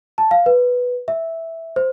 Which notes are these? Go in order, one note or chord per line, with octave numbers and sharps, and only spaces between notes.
A5
F5
B4
E5
C5